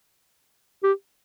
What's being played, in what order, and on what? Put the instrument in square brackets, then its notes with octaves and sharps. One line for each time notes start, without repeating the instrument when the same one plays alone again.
[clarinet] G4